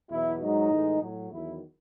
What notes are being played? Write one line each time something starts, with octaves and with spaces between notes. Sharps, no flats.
E2 B2 F#3 E4
G#2 F#3 D#4
A2 E3 G#3
A2 F#3
E2 D#3 F#3 E4